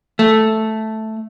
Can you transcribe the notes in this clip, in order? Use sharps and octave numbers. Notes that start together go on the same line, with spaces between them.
A3